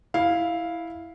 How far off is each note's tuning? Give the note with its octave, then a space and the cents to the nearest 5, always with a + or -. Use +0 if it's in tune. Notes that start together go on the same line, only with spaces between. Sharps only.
E4 -5 F5 +0